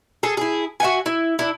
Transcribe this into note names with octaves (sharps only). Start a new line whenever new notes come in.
G#4 A4
E4 G#4
F#4 E5 F#5 G#5
E4
D4 E4